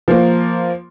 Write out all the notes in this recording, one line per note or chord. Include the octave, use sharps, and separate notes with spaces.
F3 A#3